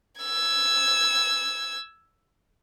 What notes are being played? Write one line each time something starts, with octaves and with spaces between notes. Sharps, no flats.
E6 G#6